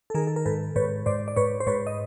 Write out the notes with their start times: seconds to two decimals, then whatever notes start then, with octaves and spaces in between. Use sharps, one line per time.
0.10 A4
0.14 D#3 G#4 A#4
0.27 A4
0.36 A#4
0.46 G#2 A4 B4
0.76 G#2 B4 C#5
1.06 G#2 C5 D5
1.28 D5
1.36 G#2 B4 C#5
1.60 C5
1.67 G#2 B4 C#5
1.87 D#5